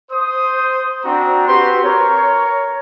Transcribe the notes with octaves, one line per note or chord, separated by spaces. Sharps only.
C5 D#6
C4 D4 F#4 A#5
C4 F#4 G4 B4 C6
A#4 C#5